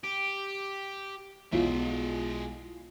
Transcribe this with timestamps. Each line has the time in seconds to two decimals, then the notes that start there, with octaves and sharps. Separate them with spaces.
0.04 G4
1.53 B1 G#3 E4 F4 E5